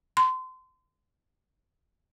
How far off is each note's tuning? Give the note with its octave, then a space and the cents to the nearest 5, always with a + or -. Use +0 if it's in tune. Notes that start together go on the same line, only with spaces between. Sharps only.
C6 -30